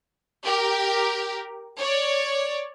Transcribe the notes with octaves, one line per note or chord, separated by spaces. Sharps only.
G4 A#4
C#5 D5